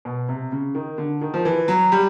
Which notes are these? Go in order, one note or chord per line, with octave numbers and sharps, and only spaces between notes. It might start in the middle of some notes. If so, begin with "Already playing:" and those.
B2
C3
C#3
D#3
D3
D#3
F3
E3
F#3
G3